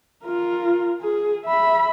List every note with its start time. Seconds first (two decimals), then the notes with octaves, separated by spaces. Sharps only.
0.24 F4 A#4
1.02 G#4
1.45 E5 B5